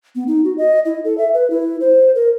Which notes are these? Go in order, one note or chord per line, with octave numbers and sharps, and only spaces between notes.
B3
D#4
F#4
D#5
E4
A4
E5
B4
E4
C5
A#4